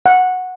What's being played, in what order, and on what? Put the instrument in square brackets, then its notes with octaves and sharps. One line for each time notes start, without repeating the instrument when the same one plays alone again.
[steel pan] F#5